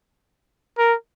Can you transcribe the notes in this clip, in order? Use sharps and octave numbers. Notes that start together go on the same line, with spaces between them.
A#4